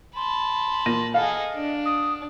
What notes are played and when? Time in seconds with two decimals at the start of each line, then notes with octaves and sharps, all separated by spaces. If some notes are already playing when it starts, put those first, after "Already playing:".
0.16 A5 B5 C6
0.86 A#2 A#6 D#7
1.14 G#4 A4 D#5 F5 F#5
1.55 D4
1.86 D#6